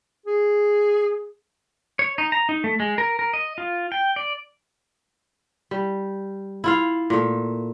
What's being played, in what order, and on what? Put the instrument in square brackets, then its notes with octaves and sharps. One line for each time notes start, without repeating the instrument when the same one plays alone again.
[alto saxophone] G#4
[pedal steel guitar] C#5
D#4
A#5
D#4
A3
G#3
A#4
A#4
D#5
F4
G5
D5
[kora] G3
E4 F4 F5
A#2 A3